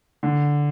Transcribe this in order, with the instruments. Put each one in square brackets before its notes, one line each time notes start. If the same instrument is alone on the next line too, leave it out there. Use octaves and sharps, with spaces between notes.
[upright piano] D3